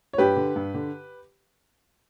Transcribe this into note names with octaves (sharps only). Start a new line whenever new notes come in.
C#5
G2 G4 B4
D3
G2
D3